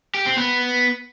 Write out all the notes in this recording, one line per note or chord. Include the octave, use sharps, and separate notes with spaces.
G4
C4
B3